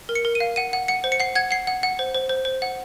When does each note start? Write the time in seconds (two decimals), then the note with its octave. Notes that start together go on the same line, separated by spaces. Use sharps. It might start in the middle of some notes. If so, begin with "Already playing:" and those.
0.09 A#4
0.15 C#7
0.25 A#4
0.35 D#7
0.40 F5
0.56 F#5 D#7
0.73 F#5
0.88 F#5 C#7
1.04 C5
1.12 C#7
1.20 F#5 C7
1.35 F#5 G#6
1.51 F#5 C7
1.67 F#5
1.83 F#5
1.99 C5
2.14 C5
2.29 C5
2.45 C5
2.62 F#5